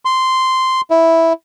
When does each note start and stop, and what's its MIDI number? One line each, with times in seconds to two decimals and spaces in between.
0.05 0.81 84
0.91 1.33 64